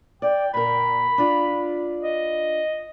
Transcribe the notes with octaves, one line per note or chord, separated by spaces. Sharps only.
D5 G5
A#2 A#4 B5
D4 F4
D#5